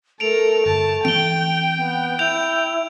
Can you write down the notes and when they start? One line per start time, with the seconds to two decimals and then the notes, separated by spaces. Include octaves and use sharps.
0.20 A3 A4 A#4 D7 F7
0.66 G1 A5
1.05 E3 C4 G5 D7 G7
1.77 B3
2.19 E4 G6 F7